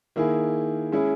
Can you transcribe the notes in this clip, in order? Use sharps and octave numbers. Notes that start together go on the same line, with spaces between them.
D#3 A#3 E4 G#4
G#3 C#4 E4 G#4